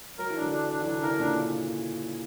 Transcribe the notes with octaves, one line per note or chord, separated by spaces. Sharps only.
F#3 A#4
E3
D4
D3 F#3
D4
D4
E3
D3 F#3 D4
C#3 E3 A#4
A#2 C#3 D4